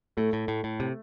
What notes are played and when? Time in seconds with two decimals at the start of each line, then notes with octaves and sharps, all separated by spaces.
0.17 A2 A3
0.33 A2
0.48 A2
0.64 A2
0.80 C3